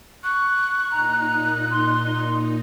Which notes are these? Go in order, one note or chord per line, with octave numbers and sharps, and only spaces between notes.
C#6 F#6
A#2 D#4 A#5
C6